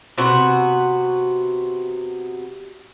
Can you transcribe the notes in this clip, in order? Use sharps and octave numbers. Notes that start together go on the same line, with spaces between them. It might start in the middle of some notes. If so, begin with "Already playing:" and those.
C3 B3 F#4